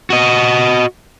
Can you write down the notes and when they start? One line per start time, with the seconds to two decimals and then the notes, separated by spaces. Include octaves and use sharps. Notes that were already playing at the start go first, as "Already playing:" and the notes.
0.10 F#4 D#5